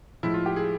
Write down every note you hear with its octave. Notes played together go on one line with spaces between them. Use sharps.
A2 F3 G#3 E4
F4
G4
G#4